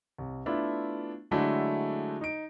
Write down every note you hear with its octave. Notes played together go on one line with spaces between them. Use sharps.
C2
A3 B3 D4 E4 F4
D3 F#3 G#3 A3 D4 E4
D#4 D7